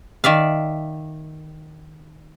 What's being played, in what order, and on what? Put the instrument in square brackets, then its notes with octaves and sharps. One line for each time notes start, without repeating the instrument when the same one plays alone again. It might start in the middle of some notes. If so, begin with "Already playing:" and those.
[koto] D#3 D5 E5 F5